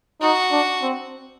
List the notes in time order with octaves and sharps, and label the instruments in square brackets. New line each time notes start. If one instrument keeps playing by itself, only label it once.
[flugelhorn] D#4 [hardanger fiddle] F#4
[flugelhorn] D4
C4